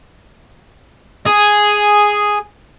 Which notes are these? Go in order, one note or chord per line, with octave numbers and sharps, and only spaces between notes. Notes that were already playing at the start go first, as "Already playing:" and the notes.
G#4